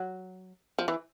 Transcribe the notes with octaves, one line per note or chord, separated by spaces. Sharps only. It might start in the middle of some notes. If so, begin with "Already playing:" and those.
Already playing: F#3
F3
E3